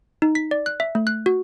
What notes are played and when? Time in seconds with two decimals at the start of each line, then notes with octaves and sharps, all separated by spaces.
0.22 D#4
0.35 B6
0.51 D5
0.66 F#6
0.80 E5
0.95 A3
1.07 F#6
1.26 F#4